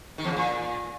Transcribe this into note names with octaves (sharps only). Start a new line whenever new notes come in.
D#3
E2
C#3
A#2